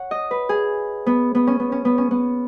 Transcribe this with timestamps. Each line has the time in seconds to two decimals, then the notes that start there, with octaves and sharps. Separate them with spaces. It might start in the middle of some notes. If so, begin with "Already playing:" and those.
Already playing: C#5 F#5
0.11 D#5
0.31 B4
0.49 G#4
1.06 B3
1.35 B3
1.47 C#4
1.60 B3
1.72 C#4
1.85 B3
1.98 C#4
2.11 B3